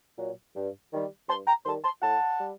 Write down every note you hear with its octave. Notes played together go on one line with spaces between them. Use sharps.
A#2 F#3
G2
D#3 G3
G2 A5 C6
G5 A#5
D#3 G3 A5 C6
A5 C6
A2 F#5 A5
G3